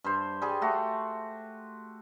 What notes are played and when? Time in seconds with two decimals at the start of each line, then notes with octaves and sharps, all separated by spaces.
0.04 G2 C5
0.42 G3 G#4
0.62 A3 F#4